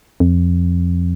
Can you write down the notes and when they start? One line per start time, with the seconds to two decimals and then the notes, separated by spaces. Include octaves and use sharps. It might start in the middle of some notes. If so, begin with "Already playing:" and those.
0.20 F2